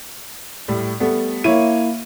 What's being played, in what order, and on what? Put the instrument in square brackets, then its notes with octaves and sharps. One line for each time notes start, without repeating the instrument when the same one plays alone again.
[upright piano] A2 G3
G3 A3 B3
[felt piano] A#3 E4 [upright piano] C#5 D#7